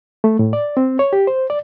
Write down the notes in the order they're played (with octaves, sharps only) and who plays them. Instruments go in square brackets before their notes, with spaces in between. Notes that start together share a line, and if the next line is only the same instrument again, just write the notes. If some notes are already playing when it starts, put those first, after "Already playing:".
[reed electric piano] A3
A2
D5
C4
C#5
G4
C5
D5